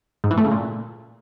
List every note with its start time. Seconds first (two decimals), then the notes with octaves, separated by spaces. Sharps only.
0.24 G#2
0.31 E3
0.38 A3
0.45 C#3
0.51 A#2